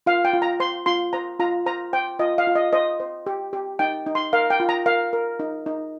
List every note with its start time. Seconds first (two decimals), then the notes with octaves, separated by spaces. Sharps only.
0.06 F4 F5
0.25 G5
0.33 F4
0.42 A#5
0.60 C5 C6
0.86 F4 C6
1.13 C5 A#5
1.40 F4 A#5
1.66 C5 A#5
1.93 C5 G5
2.19 F4 D#5
2.38 F5
2.47 F4
2.55 D#5
2.73 C5 D#5
3.00 C5
3.26 G4
3.53 G4
3.79 D#4 G5
4.06 D#4
4.15 C6
4.33 A#4 F5
4.50 G5
4.60 F4
4.69 A#5
4.86 A#4 F5
5.13 A#4
5.40 D#4
5.66 D#4